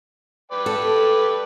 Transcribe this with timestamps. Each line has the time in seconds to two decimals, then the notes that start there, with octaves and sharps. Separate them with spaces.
0.52 B4 D5 G5
0.66 A4